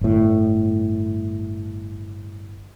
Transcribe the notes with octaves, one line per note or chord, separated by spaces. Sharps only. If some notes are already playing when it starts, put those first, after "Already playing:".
G1 A2